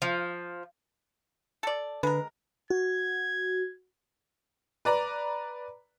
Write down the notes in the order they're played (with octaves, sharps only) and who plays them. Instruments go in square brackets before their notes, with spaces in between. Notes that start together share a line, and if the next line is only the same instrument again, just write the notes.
[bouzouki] F3
[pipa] A4 D5
[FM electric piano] D3 B4 [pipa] G#3 A#4
[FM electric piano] F#4 [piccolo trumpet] G#6
[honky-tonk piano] B4 D5 A#5